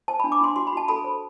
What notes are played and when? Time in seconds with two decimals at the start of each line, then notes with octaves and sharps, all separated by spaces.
0.08 C5 A5
0.20 D4 B5
0.32 D6
0.41 D4 C6
0.56 F#4 C6
0.67 B5
0.72 F#4 A5
0.88 A4 B5
1.04 C5